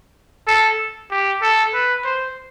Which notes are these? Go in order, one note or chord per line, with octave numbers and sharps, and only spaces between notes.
A4
G4
A4
B4
C5